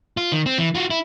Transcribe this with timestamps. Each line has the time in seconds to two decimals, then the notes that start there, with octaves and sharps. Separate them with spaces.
0.17 F4
0.32 D#3
0.46 C4
0.58 E3
0.75 F4 F#4
0.90 E4